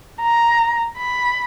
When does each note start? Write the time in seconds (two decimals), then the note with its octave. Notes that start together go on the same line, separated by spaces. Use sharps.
0.23 A#5
0.98 B5